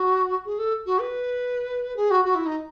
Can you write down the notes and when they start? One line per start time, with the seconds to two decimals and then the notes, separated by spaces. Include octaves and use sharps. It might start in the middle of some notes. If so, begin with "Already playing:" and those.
Already playing: F#4
0.45 G#4
0.58 A4
0.86 F#4
1.00 B4
1.96 G#4
2.10 F#4
2.24 F#4
2.35 E4
2.45 D#4